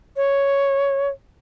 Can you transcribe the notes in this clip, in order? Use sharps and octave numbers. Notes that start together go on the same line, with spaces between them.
C#5